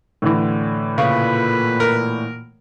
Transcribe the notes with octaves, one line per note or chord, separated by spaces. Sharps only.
A2 D3 E3
A#2 C#3 B4
A#4